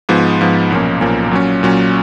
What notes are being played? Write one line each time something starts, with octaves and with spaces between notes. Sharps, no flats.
G#2 F3 B3
G#2 F3 B3
B1 A#2 F3 A#3 C#4
B1 A#2 F3 A#3 C#4
A#2 F#3 C#4
A#2 F#3 C#4